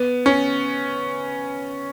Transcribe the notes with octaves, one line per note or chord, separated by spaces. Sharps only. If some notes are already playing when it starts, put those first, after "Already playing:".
Already playing: B3
C#4